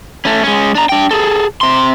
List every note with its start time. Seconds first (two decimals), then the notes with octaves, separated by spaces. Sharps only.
0.25 A3 C#4
0.43 G#3 C#4
0.75 D4 A#5
0.89 D4 G5
1.11 G#4 A4
1.61 C3 C6